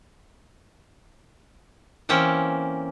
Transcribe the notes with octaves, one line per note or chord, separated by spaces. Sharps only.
E3 A#3 C4 C#4